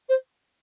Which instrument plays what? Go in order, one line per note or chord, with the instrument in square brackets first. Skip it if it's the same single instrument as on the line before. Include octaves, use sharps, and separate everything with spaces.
[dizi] C5